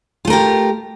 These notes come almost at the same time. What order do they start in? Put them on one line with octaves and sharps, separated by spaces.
F4 A3 A#4 G4